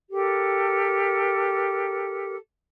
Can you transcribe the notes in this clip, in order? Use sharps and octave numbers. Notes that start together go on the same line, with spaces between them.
G4 A4 A#4